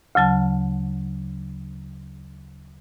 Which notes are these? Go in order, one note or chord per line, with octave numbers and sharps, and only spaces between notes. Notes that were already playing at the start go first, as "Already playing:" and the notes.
D2 C#3 F#3 A5